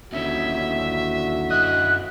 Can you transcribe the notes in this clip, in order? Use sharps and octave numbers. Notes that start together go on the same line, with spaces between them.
D#2 D3 C#4 E4 F#4 E5
F#2 D#5 F#6